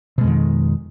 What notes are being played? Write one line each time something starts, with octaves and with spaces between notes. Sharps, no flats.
F2 B2 D#3 G#3